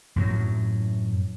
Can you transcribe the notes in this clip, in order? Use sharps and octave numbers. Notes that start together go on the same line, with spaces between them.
F#2 A2 F#3